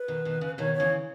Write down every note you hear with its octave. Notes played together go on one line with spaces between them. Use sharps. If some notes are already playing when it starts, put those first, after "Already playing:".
Already playing: B4
B2 D#3
B2 D#3
C#3
B2 D#3 C#5
C#5
C#3 E3